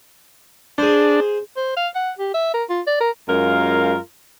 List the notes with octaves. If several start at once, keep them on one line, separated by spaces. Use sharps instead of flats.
D4 G#4 C5
C5
F5
F#5
G4
E5
A#4
F4
D5
A#4
F#2 G#3 F4 A#4 F5 A#5